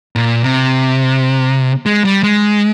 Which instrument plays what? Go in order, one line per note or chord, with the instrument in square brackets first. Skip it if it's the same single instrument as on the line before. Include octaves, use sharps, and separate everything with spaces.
[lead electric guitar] A#2
C3
G#3
G3
G#3